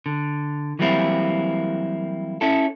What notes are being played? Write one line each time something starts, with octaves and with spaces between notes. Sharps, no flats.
D3
E3 F#3 G3 A#3 C4 E4
C#4 E4 A4